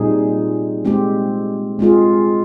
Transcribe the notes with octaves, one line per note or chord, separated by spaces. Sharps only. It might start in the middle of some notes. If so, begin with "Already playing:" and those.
Already playing: A#2 G3 C4 D#4 G#4
G#3 C4 G4
G#3 C4 F4 G#4